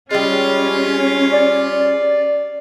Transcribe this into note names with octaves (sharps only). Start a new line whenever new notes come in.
G3 G#3 C#4 F4
D5